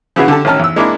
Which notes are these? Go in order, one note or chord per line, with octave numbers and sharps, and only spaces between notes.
C#3 E3 B3 E4 F#4 G#4
D3 G4 A4 A5
A1 D#3 C#4 A5 A#5 F6
E2 E6
G#3 A#3 D4 E4 D6